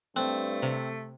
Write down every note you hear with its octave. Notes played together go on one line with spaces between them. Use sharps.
G2 A3 C4 F#6
C3